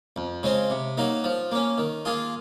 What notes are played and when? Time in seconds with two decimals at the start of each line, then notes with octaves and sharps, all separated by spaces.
0.16 F2
0.43 C#3 G#3 C4
0.70 C3
0.97 F#3 A#3 D#4
1.24 F3
1.51 A#3 C#4
1.78 D#3
2.05 A#3 F4 G#4